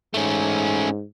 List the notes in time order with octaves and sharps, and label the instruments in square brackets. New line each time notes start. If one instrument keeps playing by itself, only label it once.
[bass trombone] G#2 [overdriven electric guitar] A3 C#4